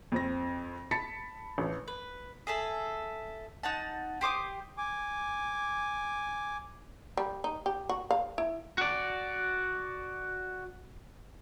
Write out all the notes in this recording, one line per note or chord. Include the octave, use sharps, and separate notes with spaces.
F2 C4 A#6
A5 B5 A6 B6 C#7
A1
B4
G#4 A4 E5
D#4 F#5 A5
G4 C5 D6 D#6
G#5 D6
G3
D#4
G4
F#4
F5
E4
F#4 D5